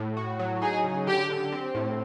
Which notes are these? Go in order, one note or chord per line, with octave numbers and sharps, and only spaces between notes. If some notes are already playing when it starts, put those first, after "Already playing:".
Already playing: A2
F#4
F#3
D#4 G#4
C#3
D3 G4
D3
C4
A2